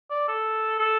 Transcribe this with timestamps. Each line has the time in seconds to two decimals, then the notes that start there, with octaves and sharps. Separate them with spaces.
0.11 D5
0.28 A4
0.80 A4